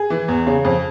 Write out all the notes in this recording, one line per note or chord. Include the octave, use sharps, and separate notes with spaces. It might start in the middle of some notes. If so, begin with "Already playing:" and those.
Already playing: G#4
E3
E2
C#3
F2